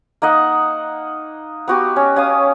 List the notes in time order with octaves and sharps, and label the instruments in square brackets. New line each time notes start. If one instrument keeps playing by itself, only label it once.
[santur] A#3 D#4 D#5 F#5
B3 F#4 G4
C#4
C#4 F5 D#6